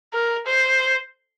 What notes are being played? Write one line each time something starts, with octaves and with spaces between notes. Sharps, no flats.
A#4
C5